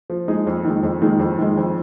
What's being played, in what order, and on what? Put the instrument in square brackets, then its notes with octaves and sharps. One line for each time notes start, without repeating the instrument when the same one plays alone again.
[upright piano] F3
G#3 D#4 G#4
F2
D#3
G#3
F2
D#3 G#3
F2
D#3 G#3
F2